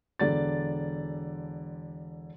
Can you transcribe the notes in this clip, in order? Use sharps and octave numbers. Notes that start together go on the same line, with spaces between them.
E1 D3 D5 A6